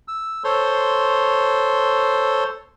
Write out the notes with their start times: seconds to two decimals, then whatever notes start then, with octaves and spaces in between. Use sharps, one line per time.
0.08 E6
0.44 A4 C5 C#5 C6